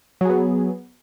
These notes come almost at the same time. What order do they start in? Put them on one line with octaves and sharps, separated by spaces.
F#3 G#4 B3